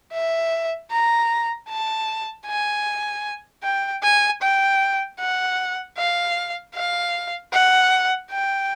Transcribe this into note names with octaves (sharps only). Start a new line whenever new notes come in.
E5
A#5
A5
G#5
G5
G#5
G5
F#5
F5
F5
F#5
G5